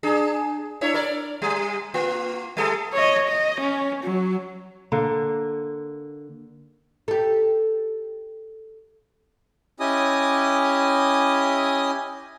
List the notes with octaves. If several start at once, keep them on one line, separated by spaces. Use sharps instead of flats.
D4 G#4
D4 E4 C#5
A#4 D5
G3
A#3 F4
G3 A4
C#5 D#5
D#5
C#4
F#3
D3 A#3
G4 A4
C#4 E4 G4 D#5 G#5 D#6